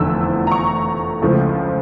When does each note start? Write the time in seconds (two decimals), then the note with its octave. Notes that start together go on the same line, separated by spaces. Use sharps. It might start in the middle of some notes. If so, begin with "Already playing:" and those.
Already playing: F1 E2 D3 F3 A3 E6
0.47 A#5
0.51 C#6
1.22 C#2 C#3 F3 A3